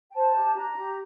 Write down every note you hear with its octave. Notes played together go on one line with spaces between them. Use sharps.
G5
C5 A5
G4
D4 A#5
G4